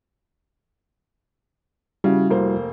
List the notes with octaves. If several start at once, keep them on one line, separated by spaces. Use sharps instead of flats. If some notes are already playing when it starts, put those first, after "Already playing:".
C#3 G3 E4 F#4
F1 A#3 C5